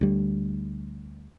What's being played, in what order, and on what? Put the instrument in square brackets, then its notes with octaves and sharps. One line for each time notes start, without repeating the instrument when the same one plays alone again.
[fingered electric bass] D2 G3